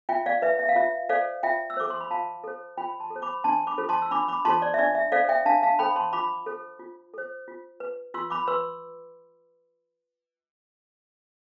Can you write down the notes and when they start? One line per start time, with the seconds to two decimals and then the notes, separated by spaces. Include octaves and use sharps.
0.09 F4 E5 G5
0.26 D5 F5
0.42 B4 E5
0.59 E5
0.69 F5
0.76 F4 E5
1.09 A4 C5 D5 F5
1.43 F4 E5 G5
1.70 E6
1.77 A4 C5 D6
1.90 C6
2.01 B5
2.10 F4 F5 A5
2.44 A4 C5
2.77 F4 G5 B5
2.99 A5 C6
3.10 A4
3.16 C5
3.22 B5 D6
3.44 D4 A5 C6
3.67 B5 D6
3.78 F4 A4 C5
3.89 A5 C6
4.02 E6
4.11 D4 B5 D6
4.28 B5 D6
4.45 F4 A4 C5 A5 C6
4.62 D5
4.74 E5
4.79 D4 D5
4.95 E5
5.12 A4 C5 D5 F5
5.29 E5 G5
5.46 D4 F5 A5
5.63 F5 A5
5.79 A4 C5 G5 B5
5.96 A5 C6
6.13 F4 B5 D6
6.46 A4 C5
6.79 F4
7.14 A4 C5
7.48 F4
7.80 B4
8.14 F4 C6 E6
8.30 B5 D6
8.47 B4 C6 E6